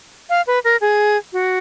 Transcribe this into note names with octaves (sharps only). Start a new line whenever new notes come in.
F5
B4
A#4
G#4
F#4